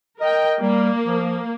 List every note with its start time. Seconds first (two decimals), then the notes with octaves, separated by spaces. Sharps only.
0.21 A#4 D#5 G5
0.62 G3 A#3
1.06 F3